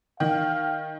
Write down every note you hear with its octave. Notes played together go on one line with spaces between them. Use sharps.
D#3 F5 G5